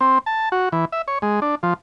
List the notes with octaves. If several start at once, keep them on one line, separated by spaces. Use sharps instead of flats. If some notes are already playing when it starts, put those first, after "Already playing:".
C4
A5
F#4
E3
E5
C#5
G#3
D4
F3